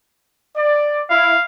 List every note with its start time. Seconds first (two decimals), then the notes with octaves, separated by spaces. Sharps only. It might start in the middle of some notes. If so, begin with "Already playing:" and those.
0.56 D5
1.10 E4 F5